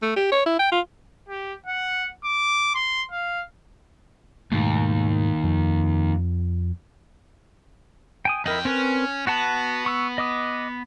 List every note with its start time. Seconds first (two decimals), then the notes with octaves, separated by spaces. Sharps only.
0.02 A3
0.16 G4
0.32 C#5
0.46 E4
0.59 G5
0.72 F4
1.29 G4
1.66 F#5
2.25 D6
2.75 C6
3.12 F5
4.52 D#2 G#2 B2 A3
5.44 F2
8.25 G5 G#5 D#6
8.46 F2 E4 A#4 D#5 G5
8.65 C4 C#4 A#4 B4
9.27 B3 F#4 F#5 A5
9.86 C#6 E6
10.18 D#5 D6 D#6